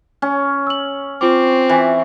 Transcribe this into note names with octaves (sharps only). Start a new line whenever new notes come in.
C#4
E6 F#7
C4 F4 D6
E3